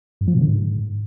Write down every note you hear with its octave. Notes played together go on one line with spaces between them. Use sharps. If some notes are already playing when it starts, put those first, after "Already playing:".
G2
F3
B2
D3
G#2